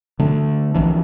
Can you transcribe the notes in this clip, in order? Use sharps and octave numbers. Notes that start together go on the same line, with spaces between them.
D3 A3
A#1 D#3 E3 D4